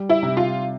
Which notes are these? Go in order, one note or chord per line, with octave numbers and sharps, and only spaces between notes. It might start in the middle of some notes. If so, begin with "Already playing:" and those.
Already playing: G3
E4
C3
F4